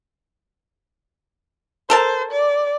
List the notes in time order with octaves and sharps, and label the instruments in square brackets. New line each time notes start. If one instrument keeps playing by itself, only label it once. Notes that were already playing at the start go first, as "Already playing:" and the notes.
[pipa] A4 A#4 A5 [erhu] C5
[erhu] D5